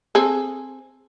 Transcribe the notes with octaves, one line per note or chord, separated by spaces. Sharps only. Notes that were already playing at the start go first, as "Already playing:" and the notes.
C4 G#4 A4